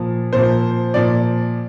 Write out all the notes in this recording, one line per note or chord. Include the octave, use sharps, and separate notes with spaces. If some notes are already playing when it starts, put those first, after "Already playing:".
Already playing: A#2 F3
A#2 F3 C5
A#2 F3 D5